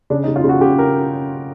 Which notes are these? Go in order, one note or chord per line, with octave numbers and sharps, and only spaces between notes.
C#3 D4
D#4
C#3
F4
C#3
F#4
C#3 G4
A#4